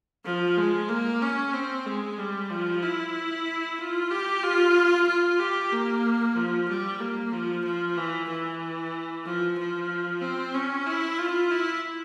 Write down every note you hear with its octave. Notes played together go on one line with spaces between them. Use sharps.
F3
G#3
A#3
C#4
C4
G#3
G3
F3
E4
F4
G4
F4
F4
G4
A#3
F3
G3
A#3
F3
F3
E3
E3
F3
F3
C4
C#4
E4
F4
E4